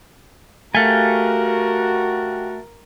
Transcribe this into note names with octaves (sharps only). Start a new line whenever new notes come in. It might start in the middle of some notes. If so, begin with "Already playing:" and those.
A3 F#4 G4 A#4 F5 G#5